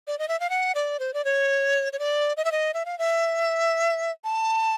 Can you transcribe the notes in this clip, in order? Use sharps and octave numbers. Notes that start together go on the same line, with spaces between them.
D5
D#5
E5
F5
F#5
D5
C5
D5
C#5
C#5
D5
D#5
E5
D#5
E5
F5
E5
A5